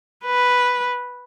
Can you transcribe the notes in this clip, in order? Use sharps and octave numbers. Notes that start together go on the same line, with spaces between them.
B4